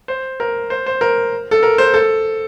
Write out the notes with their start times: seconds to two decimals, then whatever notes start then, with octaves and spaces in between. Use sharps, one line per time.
0.08 C5
0.40 A#4
0.70 C5
0.86 C5
1.01 A#4
1.51 A4
1.63 A#4
1.78 C5
1.94 A4